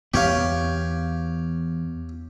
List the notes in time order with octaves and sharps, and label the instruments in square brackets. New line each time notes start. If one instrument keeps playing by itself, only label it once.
[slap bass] E2 B3 [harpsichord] G4 C#5 F5